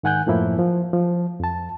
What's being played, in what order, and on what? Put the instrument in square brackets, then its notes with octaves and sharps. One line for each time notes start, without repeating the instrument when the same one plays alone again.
[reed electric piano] G#2 D#3 F#5 G#5 F#6 G6
F#2 A2 F3 A#3 E4
F3
F3
F2 A5